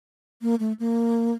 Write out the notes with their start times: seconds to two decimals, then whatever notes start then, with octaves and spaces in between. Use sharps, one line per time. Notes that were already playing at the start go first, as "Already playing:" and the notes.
0.42 A#3
0.60 A3
0.80 A#3